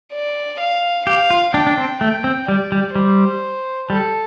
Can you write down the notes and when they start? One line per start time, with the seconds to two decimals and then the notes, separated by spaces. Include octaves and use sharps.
0.13 D5
0.60 F5
1.06 G4 F5
1.30 F4
1.54 D4 G5
1.67 D4
1.78 C4
2.01 A3 G5
2.24 C4
2.48 G3 D5
2.72 G3
2.95 G3 C5
3.89 G3 A4